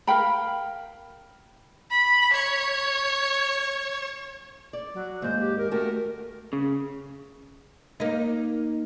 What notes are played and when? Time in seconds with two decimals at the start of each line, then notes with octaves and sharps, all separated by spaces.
0.07 A#4 F5 G5 B5
1.90 B5
2.33 C#5
4.73 D5
4.94 F#3
5.22 D#2 G#2 C5
5.40 G4
5.58 A#4
5.71 A3 F#4 G4 A#4
6.53 C#3
8.00 A#3 D#4